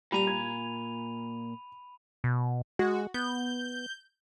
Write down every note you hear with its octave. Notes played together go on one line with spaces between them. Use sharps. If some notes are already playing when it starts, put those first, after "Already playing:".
A#2 G3 A#5 B5 D#7 F7
G#6
B2
G#3 F#4
B3 G6